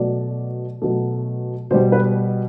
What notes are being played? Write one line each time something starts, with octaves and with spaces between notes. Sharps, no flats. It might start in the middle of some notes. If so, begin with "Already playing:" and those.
Already playing: B2 F#3 A3 D5
B2 F#3 A3
B2 G3 C5
B4